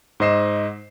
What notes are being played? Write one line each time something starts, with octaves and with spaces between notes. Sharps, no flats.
G#2 C5 D#5 C7 E7